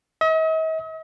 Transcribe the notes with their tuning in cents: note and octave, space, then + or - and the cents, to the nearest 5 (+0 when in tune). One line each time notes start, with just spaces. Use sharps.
D#5 +45